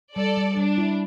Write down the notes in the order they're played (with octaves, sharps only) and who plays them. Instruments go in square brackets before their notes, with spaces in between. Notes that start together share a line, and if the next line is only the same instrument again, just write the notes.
[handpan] G3 [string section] A4 D5
[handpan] G3
[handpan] G3 [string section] D4
[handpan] E4